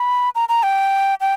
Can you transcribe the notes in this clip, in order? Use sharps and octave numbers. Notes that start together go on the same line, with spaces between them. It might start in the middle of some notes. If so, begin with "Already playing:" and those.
Already playing: B5
A#5
A#5
G5
G5